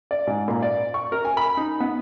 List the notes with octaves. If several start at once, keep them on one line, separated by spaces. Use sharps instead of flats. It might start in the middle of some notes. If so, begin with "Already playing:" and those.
D5
G#2
A#2
D5
C#6
A#4
G#5
B5
D#4
B3